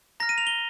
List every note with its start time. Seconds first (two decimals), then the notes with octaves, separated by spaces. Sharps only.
0.20 A#5 F6 A#6
0.29 D#7
0.38 F7
0.47 G7